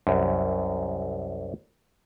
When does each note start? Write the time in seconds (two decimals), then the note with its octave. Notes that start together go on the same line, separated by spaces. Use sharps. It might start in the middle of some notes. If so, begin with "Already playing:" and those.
0.07 C2 F#2